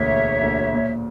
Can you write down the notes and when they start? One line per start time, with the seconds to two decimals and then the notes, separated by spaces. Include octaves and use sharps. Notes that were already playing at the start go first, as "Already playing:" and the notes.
Already playing: E1 D2 D3 A#3 C#5 E5
0.11 E1
0.41 D2 D3 A#3
0.73 A#2